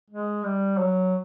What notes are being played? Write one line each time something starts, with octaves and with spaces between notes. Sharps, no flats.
G#3
G3
F#3